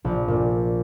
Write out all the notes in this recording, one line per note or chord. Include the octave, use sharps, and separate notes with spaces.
A#1
A#2